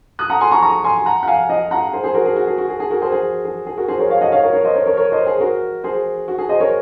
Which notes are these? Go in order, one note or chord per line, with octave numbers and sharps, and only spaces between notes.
D#6 F#6
F#5 A#5
G#5 C6
A#5 C#6
A#5 C#6
G#5 C6
F#5 A#5
F#5
F5 G#5
D#5 F#5
F#5 A#5
G#4 C5
G#4 C5
F#4 A#4
G#4
F#4
G#4
F#4
G#4
G#4
F#4 A#4
G#4 C5
G#4
G#4
G#4
F#4 A#4
G#4 C5
A#4 C#5
C#5 F5
D#5 F#5
C#5 F5
A#4 C#5
A#4 C#5
C5 D#5
A#4 C#5
A#4 C#5
A#4 C#5
C5 D#5
G#4 C5
F#4 A#4
G#4 C5
F#4
G#4
C5 D#5
A#4 C#5